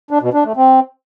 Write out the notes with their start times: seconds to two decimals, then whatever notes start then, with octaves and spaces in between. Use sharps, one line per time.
0.11 D4
0.22 B2
0.34 D4
0.45 A3
0.57 C4